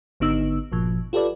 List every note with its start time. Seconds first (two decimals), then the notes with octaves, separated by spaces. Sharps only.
0.20 G#1 D3 B3 D#4 E6
0.72 G1 A#2 F3
1.13 F4 G4 A4 B4 D5